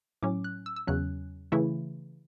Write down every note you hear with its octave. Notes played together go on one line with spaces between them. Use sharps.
A2 F#3 C#4 D6
F#6
E6
E6
E2 C#3 F#3 C#4 F#6
C#3 E3 A3 E4